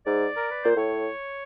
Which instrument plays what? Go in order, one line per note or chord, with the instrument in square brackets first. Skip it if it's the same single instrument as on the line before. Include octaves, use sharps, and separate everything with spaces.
[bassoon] G#2 [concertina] D5
[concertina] A#4
B4
[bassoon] A#2 [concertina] C5
[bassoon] A2 [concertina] C#5